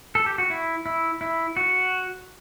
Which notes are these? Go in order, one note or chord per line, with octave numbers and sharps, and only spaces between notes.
A4
G4
F#4
E4
E4
E4
F#4